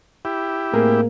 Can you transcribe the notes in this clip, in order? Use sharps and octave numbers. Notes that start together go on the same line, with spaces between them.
E4 G4
A2 A#3 C4 G#4 A#4